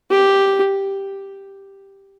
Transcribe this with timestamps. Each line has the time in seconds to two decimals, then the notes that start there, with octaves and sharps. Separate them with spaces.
0.11 G4